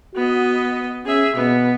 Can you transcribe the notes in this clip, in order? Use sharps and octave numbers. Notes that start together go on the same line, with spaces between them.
B3 F#4 D#5
C#4 G#4 E5
B2 B3